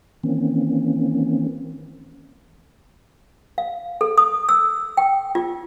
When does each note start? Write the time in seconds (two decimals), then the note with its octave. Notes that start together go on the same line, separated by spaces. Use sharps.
0.23 D#3 E3 A#3 C4 C#4
3.58 F5
4.01 A4
4.18 D#6
4.49 E6
4.97 G5
5.35 F4